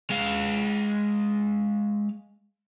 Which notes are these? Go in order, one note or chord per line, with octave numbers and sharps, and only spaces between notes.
G#3 F5